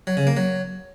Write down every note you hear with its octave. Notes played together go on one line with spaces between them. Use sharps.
F#3
C#3
A#3
F#3